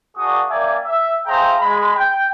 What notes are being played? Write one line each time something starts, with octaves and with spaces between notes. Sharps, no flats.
A#3 D4 F#4 G#4 C#6 D#6
A#3 C#4 D5 E5 G5 G#5
E5
G#4 C5 E5 F5 G5 A#5
G#3 B5
G5